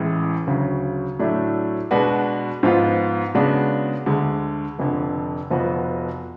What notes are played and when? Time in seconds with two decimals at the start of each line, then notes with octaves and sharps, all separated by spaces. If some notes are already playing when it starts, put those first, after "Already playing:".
Already playing: A1 A2 G#3
0.47 D2 C#3 F#3
1.19 A2 F#3 A3 D4
1.91 B2 G#3 D4 F#4 B4
2.63 G#2 F3 B3 F4
3.35 C#3 G#3 B3 D4 F#4
4.06 D2 D3 G#3
4.79 F1 F2 D3
5.50 F1 F2 F3 B3 F#4